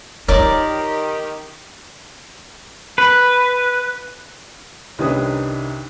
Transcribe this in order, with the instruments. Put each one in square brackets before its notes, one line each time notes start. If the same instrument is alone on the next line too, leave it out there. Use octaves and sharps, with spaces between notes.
[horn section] D#3 G4 [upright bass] F4 [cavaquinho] A#4 D5 D6 [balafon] C#5
[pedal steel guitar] B4
[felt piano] C2 D#3 C#4 D4 B4 D#6